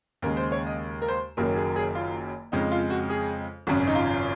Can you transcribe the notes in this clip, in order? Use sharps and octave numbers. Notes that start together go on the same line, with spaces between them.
D#2 C#3 G#3 A#4
C5
C#5
D#5
A#4
C5
F#1 F#2 D#3 F#3 A#3 A#4
G#4
G#4
F4
F2 C#3 G#3 D#4
F4
F#4
G#4
G#1 F#2 C#3 F#4
D#4
F4